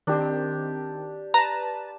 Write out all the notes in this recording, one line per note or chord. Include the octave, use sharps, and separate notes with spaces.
D#3 C4 D4 G4
B4 A5 A#5